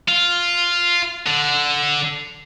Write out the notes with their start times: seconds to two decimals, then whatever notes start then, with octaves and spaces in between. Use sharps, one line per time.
0.08 F4
1.26 D3